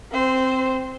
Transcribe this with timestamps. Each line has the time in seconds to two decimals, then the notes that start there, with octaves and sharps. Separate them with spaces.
0.12 C4 C5